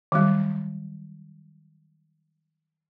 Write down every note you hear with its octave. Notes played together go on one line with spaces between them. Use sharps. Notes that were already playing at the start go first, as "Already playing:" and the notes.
D#3 F#3 G3